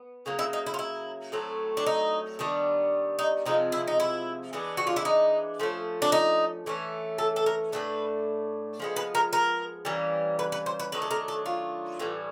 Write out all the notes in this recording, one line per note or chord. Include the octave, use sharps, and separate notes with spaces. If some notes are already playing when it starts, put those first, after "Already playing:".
Already playing: B3
C#3 F#3 A#3
E4
D#4
E4
F4
E4
A2 F#3 A3 C4
D4
D#4
D#3 G3 B3 D4
D#4
C3 F3 G#3 C4 D#4
E4
D#4
E4
E3 G#3 B3 D4
F#4
F4
E4
D#4
F3 A3 C#4
D4
D#4
E3 A3 C#4
A4
A4
A#4
A2 E3 A3 D4 B4
F3 G#3 B3
B4
A#4
A#4
E3 G3 A#3 C#4
B4
B4
C5
B4
D#3 F#3 A3 D4 B4
A4
A#4
A4
F4
A2 E3 G3